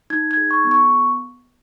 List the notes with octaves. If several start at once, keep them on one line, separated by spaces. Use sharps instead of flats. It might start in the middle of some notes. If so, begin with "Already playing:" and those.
D#4 G#6
G#6
G#4
C#6
B3
C#6